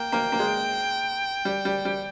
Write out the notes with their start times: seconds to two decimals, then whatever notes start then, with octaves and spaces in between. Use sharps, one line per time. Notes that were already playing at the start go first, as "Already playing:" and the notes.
Already playing: A#3 G5
0.12 A#3
0.32 A#3
0.39 G#3
1.45 G3
1.65 G3
1.85 G3